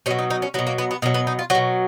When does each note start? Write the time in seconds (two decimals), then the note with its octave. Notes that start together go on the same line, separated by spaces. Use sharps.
0.06 B2 F#3 C#4
0.19 D#4
0.30 D#4
0.42 C#4
0.54 F#3 B3
0.59 B2
0.67 A#3
0.78 B3
0.91 B3
1.02 B2 F#3 A#3
1.14 B3
1.27 D#4
1.39 F4
1.50 F#3 F#4
1.55 B2